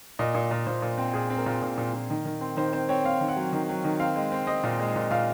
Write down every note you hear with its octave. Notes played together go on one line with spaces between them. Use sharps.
A#2 D#5
A#2
A#2
A#2 C5
A#2
C4
A#2 G#4
C4
A#4
A#2
A#2
A#2
A#2
D#3
D#3
C4
D#3 C5
C4 C5
C4 C#5
C4 F5
D#3
F#5
F#3
D#3
F#3
D#3
C4 F5
G#3
C4
C4 D#5
A#2
G#3
A#2
A#2 F5